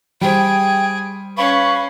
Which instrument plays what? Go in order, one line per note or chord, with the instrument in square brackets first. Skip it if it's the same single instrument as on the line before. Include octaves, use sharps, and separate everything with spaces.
[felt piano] G3 C5 [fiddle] G#4 [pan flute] G5
[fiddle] C#4 [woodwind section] B4 B5 C#6 [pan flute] F5